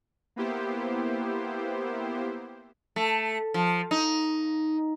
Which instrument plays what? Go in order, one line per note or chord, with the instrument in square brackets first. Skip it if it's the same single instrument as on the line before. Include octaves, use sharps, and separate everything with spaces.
[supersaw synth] A#3 B3 E4 G4 C5
[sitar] A3
F3
D#4